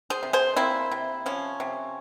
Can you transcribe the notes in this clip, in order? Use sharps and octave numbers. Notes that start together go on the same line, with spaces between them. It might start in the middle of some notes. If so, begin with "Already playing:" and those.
G#4 C5
C3
G#4 C5
A#3 C4 E4
C3
F3 C#4
C3